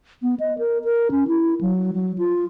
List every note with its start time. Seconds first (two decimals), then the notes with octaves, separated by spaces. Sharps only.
0.23 B3
0.40 D#5
0.58 A#4
0.84 A#4
1.11 C#4
1.27 E4
1.61 F#3
1.93 F#3
2.18 F4